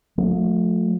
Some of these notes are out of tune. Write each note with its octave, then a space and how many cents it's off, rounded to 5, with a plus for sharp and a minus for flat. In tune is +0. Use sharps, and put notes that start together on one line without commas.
F3 +45 A3 +0